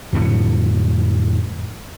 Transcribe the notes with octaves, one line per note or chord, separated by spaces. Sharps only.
F2 A2 D3 F#3